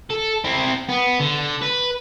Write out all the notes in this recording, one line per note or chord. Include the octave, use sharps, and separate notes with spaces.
A4
C4 E4
B3
D3
B4